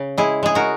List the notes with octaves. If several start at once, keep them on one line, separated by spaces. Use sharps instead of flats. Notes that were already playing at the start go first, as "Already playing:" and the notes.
Already playing: C#3
G#3 E4 G#4
G#3 G#4
F#4 A#4